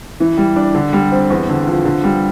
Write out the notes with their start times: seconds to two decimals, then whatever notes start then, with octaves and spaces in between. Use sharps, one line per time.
0.20 E3
0.37 G3
0.56 D4
0.75 D3
0.93 G3
1.12 C4
1.30 E2
1.49 D3
1.68 F3
1.85 D3
2.04 G3